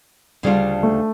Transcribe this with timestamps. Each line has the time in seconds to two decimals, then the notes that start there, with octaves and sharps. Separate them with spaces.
0.43 D2 C#3 G3 D4 F4
0.83 A3